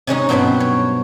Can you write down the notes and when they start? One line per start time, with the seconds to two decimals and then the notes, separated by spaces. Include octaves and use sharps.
0.07 C3 G#3 C#4 D#4
0.29 G2 B2 F#3 C5 G5 B5
0.60 C#5